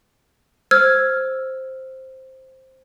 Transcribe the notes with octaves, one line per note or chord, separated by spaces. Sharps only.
C5 E6 F6 G#6